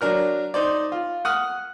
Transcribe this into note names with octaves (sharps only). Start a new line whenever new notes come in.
F#3 D4 A#4 F6
D#4 C5 D5
F4
F#5 D#6 F6